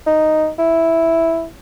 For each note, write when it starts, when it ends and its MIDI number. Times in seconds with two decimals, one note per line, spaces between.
0.06 0.49 63
0.58 1.46 64